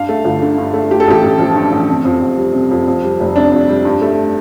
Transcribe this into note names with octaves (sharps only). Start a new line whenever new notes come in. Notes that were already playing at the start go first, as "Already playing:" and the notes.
Already playing: G2 F5
A3
G1
D3
G2
A3
G2 G4
A4
A1 G4
A1
F3
G2
A1
C3
F2
F2
G3
C3
F2
F2
G3
F1
C3 D4
F2
G3
G2
A3